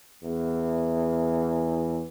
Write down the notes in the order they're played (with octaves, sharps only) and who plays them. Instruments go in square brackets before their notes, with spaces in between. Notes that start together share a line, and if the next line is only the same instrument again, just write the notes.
[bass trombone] E2